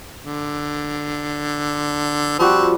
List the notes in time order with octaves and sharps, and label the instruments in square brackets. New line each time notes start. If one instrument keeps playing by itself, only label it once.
[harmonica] D3
[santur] F3 G3 F#4 [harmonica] C4